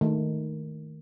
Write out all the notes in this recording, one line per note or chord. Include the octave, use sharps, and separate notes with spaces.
D#3 A3